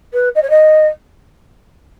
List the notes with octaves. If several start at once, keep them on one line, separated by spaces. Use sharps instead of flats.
B4
D#5
C#5
D#5